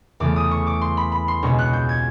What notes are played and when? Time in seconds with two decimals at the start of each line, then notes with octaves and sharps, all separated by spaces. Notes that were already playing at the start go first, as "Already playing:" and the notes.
0.20 E2 C#3 E3 A3 D6
0.36 D#6
0.51 C#6
0.67 D6
0.81 C6
0.97 B5
1.12 B5
1.28 C6
1.43 C#2 B2 G#3 C#4 C#6
1.59 F#6
1.73 G6
1.89 G#6